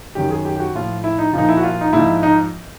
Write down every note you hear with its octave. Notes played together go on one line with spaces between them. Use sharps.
F#2 D#3 F#3 G4
G#4
G4
G4
F#4
A2 F3 F4
E4
D#4
A#2 F3 D#4
E4
F#4
F4
D#4
G#2 F3 E4
D#4